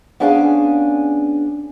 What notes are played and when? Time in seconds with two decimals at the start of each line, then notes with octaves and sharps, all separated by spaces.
0.20 B3 C#4 D4 G#4 F5 G#5